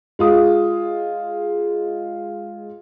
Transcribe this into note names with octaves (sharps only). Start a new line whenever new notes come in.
G#3 F4 D#6